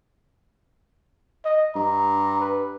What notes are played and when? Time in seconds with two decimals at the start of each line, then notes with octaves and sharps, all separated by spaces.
1.45 D#5
1.75 G2 A#5
2.40 B4